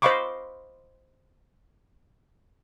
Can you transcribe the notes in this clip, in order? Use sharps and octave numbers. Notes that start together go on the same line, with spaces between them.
C5 D#5 F5 B5 C#6 D6